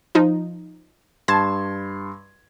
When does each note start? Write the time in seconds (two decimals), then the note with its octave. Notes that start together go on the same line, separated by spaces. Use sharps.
0.15 F3 D#4
1.28 G2 A5 C6 G#6